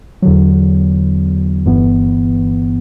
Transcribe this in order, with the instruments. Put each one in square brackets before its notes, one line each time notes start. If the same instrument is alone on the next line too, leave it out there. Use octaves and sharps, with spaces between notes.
[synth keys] E2 D3 F#3
G1 G2 E3 B3